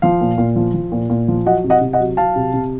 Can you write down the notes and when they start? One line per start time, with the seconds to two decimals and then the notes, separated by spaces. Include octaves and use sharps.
0.02 F3 F5
0.21 A#2
0.38 A#2
0.56 F3
0.74 F3
0.92 A#2
1.10 A#2
1.28 F3
1.46 F#3 D#5 F#5
1.64 C3
1.70 D#5 F#5
1.81 C3
1.93 D#5 F#5
2.00 F#3
2.17 F#3 F5 A5
2.36 C3
2.54 C3